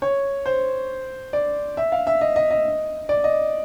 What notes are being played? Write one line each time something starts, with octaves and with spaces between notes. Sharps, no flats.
C#5
C5
D5
E5
F5
E5
D#5
D#5
D#5
D5
D#5